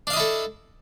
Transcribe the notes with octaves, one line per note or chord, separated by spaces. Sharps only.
D4 E4 A4 D#5 F5